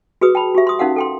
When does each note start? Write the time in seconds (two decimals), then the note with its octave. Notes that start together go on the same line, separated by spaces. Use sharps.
0.21 F#4 G#4 B4 D#6
0.35 G5 A5 B5
0.55 F#4 G4 E5
0.67 C6 D#6
0.79 C#4 D#4 A#4 F5 F#5
0.96 A4 G5 C6